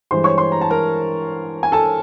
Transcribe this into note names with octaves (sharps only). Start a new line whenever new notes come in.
G2 E3 G#3 C5 C6
C#5 C#6
C5 C6
A#5
A5
A#4 A#5
G#5
A4 A5